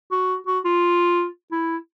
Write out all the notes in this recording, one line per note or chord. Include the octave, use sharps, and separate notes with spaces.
F#4
F#4
F4
E4